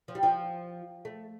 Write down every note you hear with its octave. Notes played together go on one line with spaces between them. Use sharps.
F3
G3
F3
A3